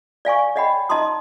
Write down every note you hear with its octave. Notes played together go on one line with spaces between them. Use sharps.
D5 F5 G#5 C#6
C#5 D#5 F#5 G5 B5
D#4 D#5 A5 A#5 C6 D#6